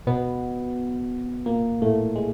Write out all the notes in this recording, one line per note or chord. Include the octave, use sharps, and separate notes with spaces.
B2 B3
A#2 A#3
A2 A3
G#3